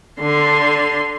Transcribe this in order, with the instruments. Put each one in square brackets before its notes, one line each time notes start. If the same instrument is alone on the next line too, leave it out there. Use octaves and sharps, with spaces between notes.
[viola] D3 C6